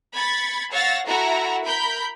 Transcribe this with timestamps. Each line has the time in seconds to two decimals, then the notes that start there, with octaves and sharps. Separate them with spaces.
0.14 B5 G#6 A6 C#7
0.71 C#5 F5 F#5 E6 A6 A#6
1.07 E4 F#4 A4 F#5 A#5
1.64 A#4 B5 G6